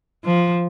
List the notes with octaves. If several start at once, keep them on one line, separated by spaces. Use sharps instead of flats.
F3